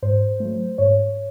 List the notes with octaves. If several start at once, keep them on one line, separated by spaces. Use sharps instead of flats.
G#2 C5
F#3 A3
G#2 C#5